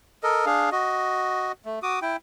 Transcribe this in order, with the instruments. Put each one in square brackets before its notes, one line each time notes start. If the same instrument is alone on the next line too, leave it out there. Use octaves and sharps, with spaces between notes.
[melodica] A4 A#4 D#5
D4 G#4 F5
F#4 D#5
A3
F#4 D6 D#6
E4 G5